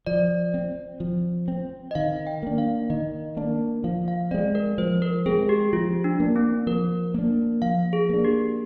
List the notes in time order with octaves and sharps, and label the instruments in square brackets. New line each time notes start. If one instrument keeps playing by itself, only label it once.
[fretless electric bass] F3 [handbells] D5
[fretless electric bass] C4
F3
C4
[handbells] D#5
[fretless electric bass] D#3 [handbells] F5
[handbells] G5
[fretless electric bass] A#3 D4
[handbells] F5
[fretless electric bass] D#3 [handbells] D#5
[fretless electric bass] A#3 D4
[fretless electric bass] F3 [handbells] F5
[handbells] F5
[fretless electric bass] G#3 C4 [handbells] D5
[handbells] A#4
[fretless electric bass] F3 [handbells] C5
[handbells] A#4
[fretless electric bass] G#3 C4 [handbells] G#4
[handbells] G4
[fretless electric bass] F3 [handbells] F4
[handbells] D4
[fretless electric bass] A#3 D4
[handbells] C4
[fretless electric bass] F3 [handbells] A#4
[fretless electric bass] A#3 D4
[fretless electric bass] F3 [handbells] F5
[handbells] G#4
[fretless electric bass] A#3 D4
[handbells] G4